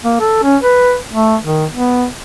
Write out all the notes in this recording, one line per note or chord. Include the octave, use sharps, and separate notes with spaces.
A#3
A4
C#4
B4
A3
D#3
B3